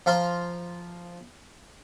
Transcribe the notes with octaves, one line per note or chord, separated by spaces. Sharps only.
F3 F4 F5 A#5 C6